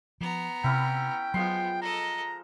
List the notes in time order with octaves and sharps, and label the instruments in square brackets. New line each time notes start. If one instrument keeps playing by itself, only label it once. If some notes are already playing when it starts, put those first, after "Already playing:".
[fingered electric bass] F3 [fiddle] B3 A#5
[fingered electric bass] C3 [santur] C#4 E4 [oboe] G5
[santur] F3 G#3 C6 [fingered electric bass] F#3 [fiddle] B3
[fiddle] A4 D#5 [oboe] A#5